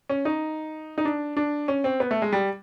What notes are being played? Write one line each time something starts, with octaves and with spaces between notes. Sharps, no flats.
C#4
D#4
D#4
D4
D4
C#4
C4
B3
A3
G#3
G3